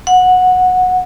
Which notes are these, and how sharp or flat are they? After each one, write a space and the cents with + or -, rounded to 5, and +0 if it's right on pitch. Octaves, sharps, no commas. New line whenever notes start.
F#5 -15